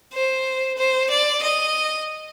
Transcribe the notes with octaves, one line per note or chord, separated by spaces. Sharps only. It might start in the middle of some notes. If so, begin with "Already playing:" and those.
C5
C5
D5
D#5